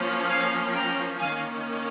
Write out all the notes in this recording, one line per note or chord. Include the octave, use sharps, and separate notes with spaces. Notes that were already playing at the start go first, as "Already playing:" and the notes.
Already playing: F3 A#3 C#4
F5 G#5
G5 A#5
D#3 A#3 C#4 F5 G#5